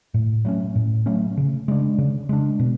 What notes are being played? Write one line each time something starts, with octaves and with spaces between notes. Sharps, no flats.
A2
F#3 A3 C#4
A2
F#3 A3 C#4
C#3
G#3 D4
C#3
G#3 D4
B2